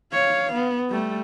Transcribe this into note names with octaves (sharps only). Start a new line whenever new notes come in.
C#5 F5
B3
G3 A3